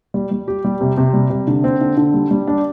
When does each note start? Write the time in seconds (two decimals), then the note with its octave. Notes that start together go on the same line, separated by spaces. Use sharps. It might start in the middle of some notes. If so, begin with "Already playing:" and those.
0.14 G3
0.31 G3
0.48 G4
0.65 G3
0.81 C3
0.98 C3
1.14 G3
1.30 C3
1.47 D3
1.64 C4
1.81 D3
1.97 D3
2.14 G3
2.31 G3
2.48 D4